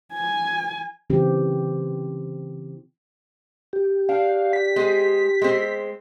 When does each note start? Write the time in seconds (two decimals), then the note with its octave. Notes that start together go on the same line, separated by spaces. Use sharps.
0.13 G#5
1.10 C#3 E3 C4 G4
3.73 G4
4.09 D4 F5
4.53 B6
4.76 G#3 C4 G#4
5.42 G#3 C4